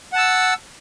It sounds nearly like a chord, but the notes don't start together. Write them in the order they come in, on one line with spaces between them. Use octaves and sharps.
F#5 A5 E6